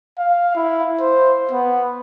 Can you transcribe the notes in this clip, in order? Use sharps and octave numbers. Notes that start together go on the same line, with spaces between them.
F5
E4
C5
B3